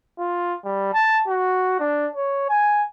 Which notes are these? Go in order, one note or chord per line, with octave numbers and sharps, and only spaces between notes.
F4
G3
A5
F#4
D4
C#5
G#5